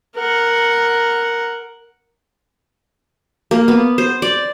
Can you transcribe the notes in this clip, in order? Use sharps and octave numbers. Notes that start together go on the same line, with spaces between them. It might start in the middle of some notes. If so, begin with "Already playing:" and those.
A#4 F#5
A#3
B3
C5
D5